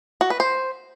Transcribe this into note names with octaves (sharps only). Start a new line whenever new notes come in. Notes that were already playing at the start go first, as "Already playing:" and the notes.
F#4
B4
C5